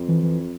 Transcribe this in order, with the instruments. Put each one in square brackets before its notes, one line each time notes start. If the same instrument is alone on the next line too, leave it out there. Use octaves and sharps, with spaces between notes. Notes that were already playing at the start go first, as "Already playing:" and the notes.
Already playing: [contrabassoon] F2
[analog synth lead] E3
E3